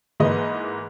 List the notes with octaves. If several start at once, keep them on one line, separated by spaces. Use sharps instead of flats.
G#2 E3 G#3 A#3 B4 D#5